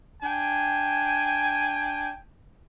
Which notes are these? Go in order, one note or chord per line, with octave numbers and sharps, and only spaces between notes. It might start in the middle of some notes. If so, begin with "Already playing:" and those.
D4 G5 G#5